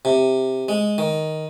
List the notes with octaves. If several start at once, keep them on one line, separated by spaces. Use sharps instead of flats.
C3
G#3
D#3